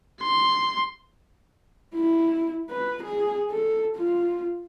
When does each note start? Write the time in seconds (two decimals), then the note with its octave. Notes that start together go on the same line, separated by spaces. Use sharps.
0.22 C6
1.96 E4
2.70 B4
3.04 G#4
3.51 A4
3.96 F4